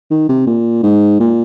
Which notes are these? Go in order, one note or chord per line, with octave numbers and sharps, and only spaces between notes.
D#3
C3
A#2
G#2
A#2